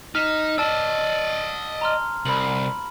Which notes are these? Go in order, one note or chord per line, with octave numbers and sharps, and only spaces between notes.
D#4 F6 B6 E7
D5 D#5 A5 E6
A#5 C6 F6
C2 B5 F#7